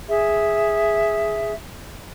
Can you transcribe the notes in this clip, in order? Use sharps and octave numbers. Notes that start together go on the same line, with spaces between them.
G#4 E5